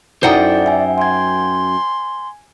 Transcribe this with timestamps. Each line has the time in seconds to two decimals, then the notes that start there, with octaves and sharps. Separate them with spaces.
0.23 F#2 D#4 E4 A4 C5 D5 F#5 G5
0.66 E5 G#5
0.98 G#5 C6 G#6